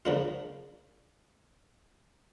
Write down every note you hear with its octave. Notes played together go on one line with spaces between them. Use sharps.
C#3 F3 A#3 D4 F4